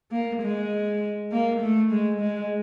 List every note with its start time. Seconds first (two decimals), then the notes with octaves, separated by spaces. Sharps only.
0.11 A#3
0.41 G#3
1.31 A#3
1.61 A3
1.91 G#3
2.20 G#3